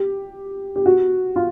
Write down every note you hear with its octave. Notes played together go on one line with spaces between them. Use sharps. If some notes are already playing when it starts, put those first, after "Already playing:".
Already playing: G4
G4
F#4
F4